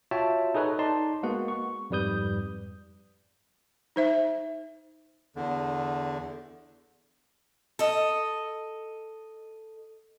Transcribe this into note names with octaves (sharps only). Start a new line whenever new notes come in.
F4 F#4 C#5 E5 G5 A5
D#4 G#4 A4 B4 C#5 D#5
D#4 D5 A5 C6
G#3 A#3 B3 F#4 F#5
C#6
F2 G#2 G3 B4 D#6 G6
D#4 C5 E5
E2 D3
A4 D#5